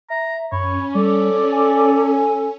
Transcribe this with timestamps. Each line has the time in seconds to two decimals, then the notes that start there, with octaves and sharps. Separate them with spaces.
0.10 E5 A#5
0.52 F#2 C#4 C#5 B5
0.95 G3 A4 D5
1.52 G#5